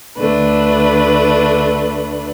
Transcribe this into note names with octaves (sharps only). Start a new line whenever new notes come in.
D2 D3 A3 D4 B4